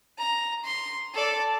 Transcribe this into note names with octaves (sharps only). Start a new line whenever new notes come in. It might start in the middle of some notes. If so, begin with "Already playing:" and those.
A#5
C6
A4 D5